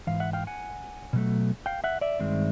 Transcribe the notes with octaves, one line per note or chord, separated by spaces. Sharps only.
G#2 E3 F5
E5 F#5
F5 G5
F#5 G#5
B2 F#3 A3
F5 G5
E5 F#5
D5 E5
G2 D#3 G#3 C4